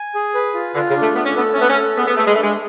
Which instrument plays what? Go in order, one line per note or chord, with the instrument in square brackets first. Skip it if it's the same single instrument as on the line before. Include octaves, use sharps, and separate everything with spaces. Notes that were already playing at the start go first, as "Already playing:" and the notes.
Already playing: [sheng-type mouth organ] G#5
G#4
B4
F4
[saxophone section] D3 [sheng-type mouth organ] F4
[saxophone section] C#3
[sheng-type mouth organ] D4
[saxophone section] A3
[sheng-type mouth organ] A3 [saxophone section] B3
[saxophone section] C#4
[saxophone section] B3 [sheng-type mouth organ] A4
[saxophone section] C#4
[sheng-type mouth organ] A3 [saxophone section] B3
[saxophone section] C#4
[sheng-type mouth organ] A4
[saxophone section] B3 [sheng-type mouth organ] G#4
[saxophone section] B3
[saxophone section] A3 [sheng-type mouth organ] B4
[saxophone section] G#3
[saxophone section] A3 [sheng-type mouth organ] D4
[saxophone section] G#3